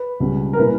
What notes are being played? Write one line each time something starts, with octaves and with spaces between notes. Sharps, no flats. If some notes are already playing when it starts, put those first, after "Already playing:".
Already playing: B4
C#2 B2 G3 C#4
A#4
A#2 G3 C#4 E4 B4